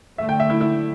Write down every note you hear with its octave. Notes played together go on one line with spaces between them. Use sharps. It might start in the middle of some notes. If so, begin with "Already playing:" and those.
D3 A3 E5
G5
E5
E4
E4